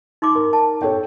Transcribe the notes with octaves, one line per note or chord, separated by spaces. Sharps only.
D#4 C6 D6
A#4
A5
A4 C#5 G5